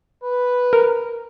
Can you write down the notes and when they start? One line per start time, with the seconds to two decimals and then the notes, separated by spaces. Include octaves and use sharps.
0.23 B4
0.73 A#4